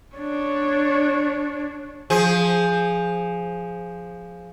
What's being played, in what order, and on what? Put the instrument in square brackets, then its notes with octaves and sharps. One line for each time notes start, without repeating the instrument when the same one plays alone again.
[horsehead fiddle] D4 C#5
[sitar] F3 G#4